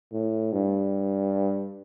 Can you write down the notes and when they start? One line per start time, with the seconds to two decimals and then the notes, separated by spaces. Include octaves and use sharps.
0.13 A2
0.53 G2